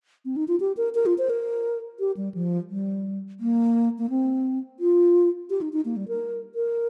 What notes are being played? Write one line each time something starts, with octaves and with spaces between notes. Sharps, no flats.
C4
D#4
F4
G4
A#4
A#4
F4
C5
A#4
G4
G3
F3
G3
A#3
A#3
C4
F4
G4
D#4
D#4
A#3
G3
A#4
A#4